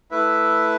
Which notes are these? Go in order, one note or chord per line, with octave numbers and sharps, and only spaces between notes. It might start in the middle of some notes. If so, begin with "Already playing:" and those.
A3 E4 B4 E5